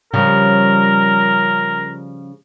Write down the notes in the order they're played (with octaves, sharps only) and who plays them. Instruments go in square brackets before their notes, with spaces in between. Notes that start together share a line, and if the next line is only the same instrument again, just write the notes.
[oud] C#3 F3 G3 [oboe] A#4